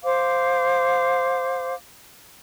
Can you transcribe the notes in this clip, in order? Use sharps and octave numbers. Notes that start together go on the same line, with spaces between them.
C5 F5 D6